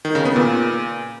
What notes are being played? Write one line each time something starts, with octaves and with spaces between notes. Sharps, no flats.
D#3
C#3
B3
A#2